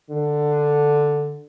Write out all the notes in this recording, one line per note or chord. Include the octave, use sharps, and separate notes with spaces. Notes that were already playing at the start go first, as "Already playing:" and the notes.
D3